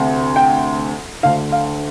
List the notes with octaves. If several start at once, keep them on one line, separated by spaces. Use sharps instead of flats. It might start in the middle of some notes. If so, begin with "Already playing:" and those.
Already playing: D2 C3
G5
D2 D3 F5
F5